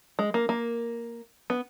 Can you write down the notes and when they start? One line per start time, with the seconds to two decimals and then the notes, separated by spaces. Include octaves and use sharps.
0.19 G#3
0.34 A#3
0.49 A#3
1.50 B3